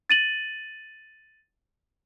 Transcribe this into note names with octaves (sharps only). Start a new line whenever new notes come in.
A6 D#7 F#7